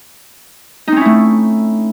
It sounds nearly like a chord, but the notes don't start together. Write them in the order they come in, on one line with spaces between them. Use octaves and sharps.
D#4 C4 C#4 E4 A3